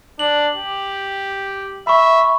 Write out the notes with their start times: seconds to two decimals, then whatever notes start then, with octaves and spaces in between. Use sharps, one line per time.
0.19 D4 F#7
0.56 G4
1.87 E5 B5 C#6